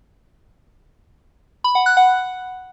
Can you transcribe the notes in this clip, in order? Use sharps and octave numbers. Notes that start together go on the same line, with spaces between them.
B5
F#5
F#6
F#5